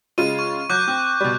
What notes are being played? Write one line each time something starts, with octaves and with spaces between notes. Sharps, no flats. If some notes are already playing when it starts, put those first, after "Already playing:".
C#3 G#3 F4 D#7
C#6
F#3 D6 F#6 G6
C4
B2 G3